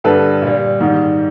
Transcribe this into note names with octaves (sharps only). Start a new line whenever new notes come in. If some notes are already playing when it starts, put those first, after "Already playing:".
G2 D3 G3 A4 B4
A#2 G3
G#2 D#3 G3